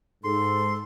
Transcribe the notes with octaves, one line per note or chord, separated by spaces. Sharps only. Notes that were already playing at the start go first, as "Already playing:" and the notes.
G#2 A4 C6